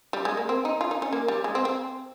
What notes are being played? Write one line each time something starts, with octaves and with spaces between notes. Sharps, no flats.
G3
G#3
A#3
C4
D#4
F4
D#4
C#4
A#3
G3
G#3
C4
C4